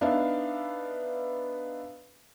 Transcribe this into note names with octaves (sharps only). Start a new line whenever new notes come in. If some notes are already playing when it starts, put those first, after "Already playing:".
B3 D4 D#4 E5 F5